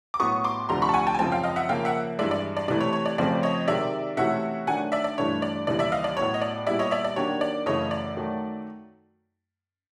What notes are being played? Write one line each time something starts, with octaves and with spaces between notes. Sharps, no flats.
D6
A2 F#3 B3 C#6 D#6
C6 D6
D2 C3 F3 A3 D4 A#5 C6
B5 C#6
A5
F#5 G#5
G5 A5
G#5
F#2 C#3 F3 G#3 C4 G5 A5
F5 G5
D#5 F5
E5 F#5
C#3 F3 A#3 F5 G5
E5 F#5
G2 E3 G#3 D5 E5
D5
D5
C3 E3 A3 D5
C#5
C#5
D5
F2 C#3 F3 A3 C4 D5
C#5 D#5
C3 D#3 G#3 D5 E5
C3 E3 A3 C#4 F#4 E5 F#5
D#3 F#3 A3 D4 F#5 G#5
D5 E5
D5
G2 E3 A3 D4 C#5
D5
D#2 C#3 E3 G3 D5
D5 E5
D#5 F5
D5
A2 F#3 B3 C#5
D#5
D5
A#2 G3 B3 E4 G#4 D5 E5
C#5 D#5
D5 E5
D5
D#3 F#3 A#3 D4 G4 C#5
D5
F#2 C#3 E3 A3 C#5 D#5
D5
D#3 F#3 A3